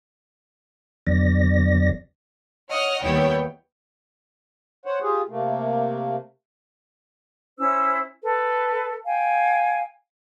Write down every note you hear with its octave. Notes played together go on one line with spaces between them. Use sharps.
F2 D3 F#3 B3 D5 A#6
C#5 D#5 F#5 F6
D#2 G3 B3 E4 C#5 G5
C5 C#5 F#5
F4 G4 G#4
C3 A3 A#3
C#4 E4 C5 E6
A4 B4
F5 G5 G#5